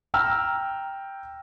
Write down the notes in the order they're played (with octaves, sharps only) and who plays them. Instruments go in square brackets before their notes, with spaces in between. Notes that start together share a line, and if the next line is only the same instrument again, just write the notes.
[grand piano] G5 A#5 E6 F6